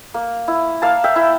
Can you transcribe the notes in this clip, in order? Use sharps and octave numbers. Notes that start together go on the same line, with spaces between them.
A#3
E4
A#3 F5 A5
E5 G5
E4